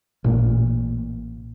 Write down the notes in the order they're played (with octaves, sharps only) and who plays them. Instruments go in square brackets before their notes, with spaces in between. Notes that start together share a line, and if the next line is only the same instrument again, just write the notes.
[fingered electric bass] A1 A#2